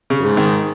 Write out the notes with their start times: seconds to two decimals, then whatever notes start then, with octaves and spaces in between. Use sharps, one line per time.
0.10 C#3
0.20 F#2
0.24 G#2
0.37 D#3